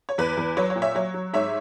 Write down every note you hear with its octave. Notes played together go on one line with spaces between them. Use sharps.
C#5
E2 B4
E2
F#3 C#5
C#5
A#2
C#5 E5
F#3 C#5
F#3
G#2 C#5 E5